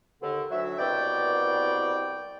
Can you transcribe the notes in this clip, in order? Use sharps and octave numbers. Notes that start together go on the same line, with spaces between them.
D#2 D3
D2 F#3 E5
C2 B2 D5 G5